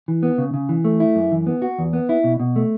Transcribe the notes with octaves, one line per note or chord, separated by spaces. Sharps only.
E3
B3
C#3
C#3
E3
A3
E4
F#2
E3
B3
F#4
E2
B3
E4
B2
B2
A3